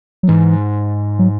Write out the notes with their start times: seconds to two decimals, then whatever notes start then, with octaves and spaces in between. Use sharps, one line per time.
0.23 F#3
0.28 G#2 E3
1.19 F#3